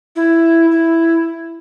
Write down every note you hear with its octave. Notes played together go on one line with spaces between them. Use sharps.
E4
E4